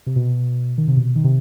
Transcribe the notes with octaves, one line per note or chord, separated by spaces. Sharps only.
C3
B2
D#3
C3
B2
D#3
C3